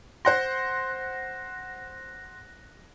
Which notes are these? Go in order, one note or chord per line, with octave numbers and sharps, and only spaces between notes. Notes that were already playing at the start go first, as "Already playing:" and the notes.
C5 F#5 C6 F#6 A#6